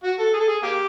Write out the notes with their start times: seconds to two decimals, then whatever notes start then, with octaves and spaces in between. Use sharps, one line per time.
0.04 F#4
0.19 A4
0.34 G#4
0.40 A4
0.48 G#4
0.63 A#3 G4